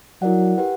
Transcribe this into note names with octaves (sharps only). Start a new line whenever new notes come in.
F#3 E4 A#4 D5 F#5
G4 B4 F#5